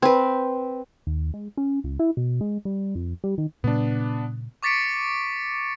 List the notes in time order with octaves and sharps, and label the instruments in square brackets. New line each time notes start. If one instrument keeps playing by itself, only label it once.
[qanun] C4 B4
[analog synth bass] D#2
G#3
C#4
C#2
E4
B2
G#3
G3
F2
G3
D#3
[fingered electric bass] A#2 C#3 G3 [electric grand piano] B3 D4
[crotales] C#6 D6 A6 B6 C#7 D7